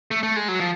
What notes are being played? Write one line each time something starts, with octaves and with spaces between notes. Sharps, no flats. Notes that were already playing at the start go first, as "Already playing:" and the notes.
A3
A3
G#3
F#3
F3